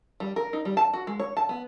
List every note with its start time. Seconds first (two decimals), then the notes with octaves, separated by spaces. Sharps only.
0.20 G3
0.36 A#4
0.53 D#4
0.65 G3
0.77 A5
0.94 F#4
1.07 G#3
1.20 C#5
1.37 A5
1.49 B3